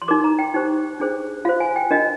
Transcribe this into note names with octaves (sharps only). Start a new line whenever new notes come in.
C6
D#4 A#4 D6
A#5
G5
D#4 G4 C5
D4 G#4 C5
F4 C5 F5
G#5
G5
D4 F4 A#4 D#5